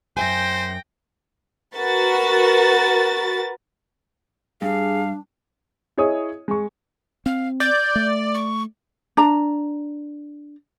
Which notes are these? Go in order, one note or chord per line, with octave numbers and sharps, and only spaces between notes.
F#2 C5 E5 G5 G#5 A#6
F#4 A#4 B4 A6
G2 D4 G#4 F5
E4 G#4 C#5 D#5 D#6
G#3 C#6
C4 F5
D5 G6
A3
C#6
D4 A#5